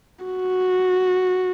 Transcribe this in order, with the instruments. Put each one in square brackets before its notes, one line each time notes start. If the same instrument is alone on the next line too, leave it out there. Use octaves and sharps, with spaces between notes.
[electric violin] F#4